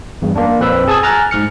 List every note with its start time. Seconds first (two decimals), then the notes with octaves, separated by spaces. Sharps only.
0.22 E2 G2
0.36 A#3 D4
0.59 A#1 F2 C4 B4 B5 E6
0.87 G#4 A5 D#6 E6 G#6
1.03 G#5 A#5 F6 F#6 A6
1.31 G#2 F6 C#7